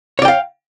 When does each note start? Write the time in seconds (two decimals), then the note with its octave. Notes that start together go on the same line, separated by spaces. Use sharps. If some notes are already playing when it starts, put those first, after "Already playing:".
0.19 C#5
0.22 D5
0.25 G5
0.28 F5